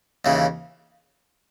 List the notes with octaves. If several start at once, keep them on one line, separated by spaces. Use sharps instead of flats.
D#2 C#3 E3